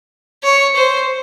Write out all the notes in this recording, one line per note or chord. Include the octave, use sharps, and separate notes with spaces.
C#5
C5